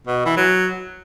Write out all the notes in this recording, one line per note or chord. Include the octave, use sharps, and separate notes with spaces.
B2
E3
F#3